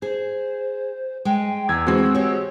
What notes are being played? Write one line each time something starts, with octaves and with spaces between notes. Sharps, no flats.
G#4 C5
G#3 G5
E2 E6 G#6
D2 E3 G#3 C4 F#4
G4 C#5